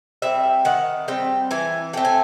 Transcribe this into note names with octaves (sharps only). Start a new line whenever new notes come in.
G3 C4 E5
D#3 F#5
G3 C4 G5
E3 G#5
A3 C4 G5
G#5